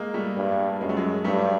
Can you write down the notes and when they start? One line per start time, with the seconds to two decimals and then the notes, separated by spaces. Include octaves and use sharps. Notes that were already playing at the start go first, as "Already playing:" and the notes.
Already playing: G#3 A#3
0.14 G3 A3
0.37 G2
0.80 F#2 G#3
0.89 A3
0.97 F#3 G#3
1.24 G2 G3 A3